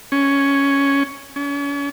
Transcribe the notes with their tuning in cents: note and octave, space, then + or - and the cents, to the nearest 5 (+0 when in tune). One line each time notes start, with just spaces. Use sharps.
C#4 +5
C#4 +40